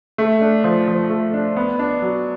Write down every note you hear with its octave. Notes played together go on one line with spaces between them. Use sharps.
A3
D4
F3
F3
A3
D4
B3
D4
F#3